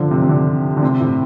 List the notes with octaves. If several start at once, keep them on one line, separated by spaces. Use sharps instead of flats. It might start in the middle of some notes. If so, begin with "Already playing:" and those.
Already playing: D3 F3
C3
C3
D3
D3
C3
A2